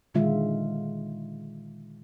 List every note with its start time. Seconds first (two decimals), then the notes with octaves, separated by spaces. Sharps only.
0.14 A#2 D3 D#3 G#3 F4 E5